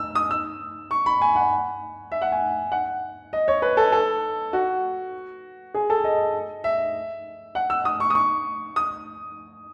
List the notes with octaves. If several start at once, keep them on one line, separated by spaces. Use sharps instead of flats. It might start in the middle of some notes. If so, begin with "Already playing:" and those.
Already playing: E6
D#6
E6
C#6
B5
G#5
F#5
E5
F#5
G#5
F#5
D#5
C#5
B4
A4
A4
F#4
G#4
A4
D#5
E5
F#5
E6
D#6
C#6
D#6
C#6
D#6